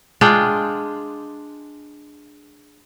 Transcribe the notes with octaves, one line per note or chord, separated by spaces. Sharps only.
G#3 D4 F4 G5